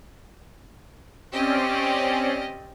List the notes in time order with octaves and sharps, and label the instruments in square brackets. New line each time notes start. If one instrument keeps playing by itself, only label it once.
[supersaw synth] C4 C#4 D5 [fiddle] G4 D#5